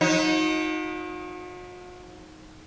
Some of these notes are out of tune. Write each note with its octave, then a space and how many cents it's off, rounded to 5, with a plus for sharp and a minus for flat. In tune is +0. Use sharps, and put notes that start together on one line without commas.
F#3 -45 D#4 +10